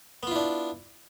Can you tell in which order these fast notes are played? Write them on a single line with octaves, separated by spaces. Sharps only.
B3 F4 E4 D4